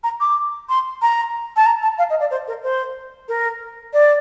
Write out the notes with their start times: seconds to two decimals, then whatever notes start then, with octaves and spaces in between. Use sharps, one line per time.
0.04 A#5
0.20 D6
0.69 C6
1.02 A#5
1.56 A5
1.66 A#5
1.82 A5
1.98 F5
2.10 D#5
2.20 D5
2.31 C5
2.48 A#4
2.63 C5
3.28 A#4
3.93 D5